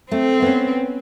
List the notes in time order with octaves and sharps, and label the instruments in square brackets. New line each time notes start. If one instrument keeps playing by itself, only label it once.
[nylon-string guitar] A3 [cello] C4
[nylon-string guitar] B3 C#4